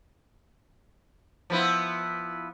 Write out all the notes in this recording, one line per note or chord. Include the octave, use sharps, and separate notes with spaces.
F3 B3 E4